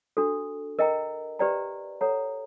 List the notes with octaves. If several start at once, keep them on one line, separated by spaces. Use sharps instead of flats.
D4 F#4 A4
A#4 D#5 G5 A#5
G4 B4 D5 G5 A#5
A4 C#5 F#5 A#5